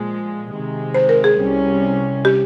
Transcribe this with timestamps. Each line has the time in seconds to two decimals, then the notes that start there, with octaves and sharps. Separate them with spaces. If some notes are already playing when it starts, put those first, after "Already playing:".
Already playing: A#2 F3 G#3
0.52 C3 D#3 G#3
0.94 C5
1.09 A#4
1.24 G#4
1.38 C2 C3 G3 C#4
2.25 G4